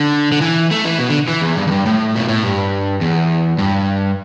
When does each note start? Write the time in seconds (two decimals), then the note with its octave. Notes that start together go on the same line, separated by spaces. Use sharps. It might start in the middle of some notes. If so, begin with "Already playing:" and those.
Already playing: D3
0.32 D3
0.41 E3
0.71 A3
0.84 E3
0.98 B2
1.09 D3
1.28 E3
1.42 E2
1.57 G2
1.67 E2
1.71 G2
1.86 A2
2.15 B2
2.28 A2
2.43 G2
3.01 E2
3.59 G2